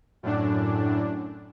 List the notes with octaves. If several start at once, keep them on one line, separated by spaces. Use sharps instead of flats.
F#2 A2 D4